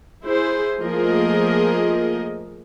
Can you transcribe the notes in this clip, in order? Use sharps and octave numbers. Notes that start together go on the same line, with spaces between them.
E4 G#4 C5
F3 A3 A#3 G#4 A#4 D#5